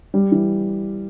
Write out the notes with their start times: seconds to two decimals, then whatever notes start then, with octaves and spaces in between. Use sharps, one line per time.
0.14 G3
0.32 E3